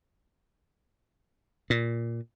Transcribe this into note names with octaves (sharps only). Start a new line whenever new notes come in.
A#2